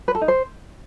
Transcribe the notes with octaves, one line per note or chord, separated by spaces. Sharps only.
B4
A4
D#4
C5